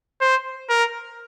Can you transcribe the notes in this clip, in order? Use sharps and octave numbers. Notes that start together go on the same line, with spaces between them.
C5
A#4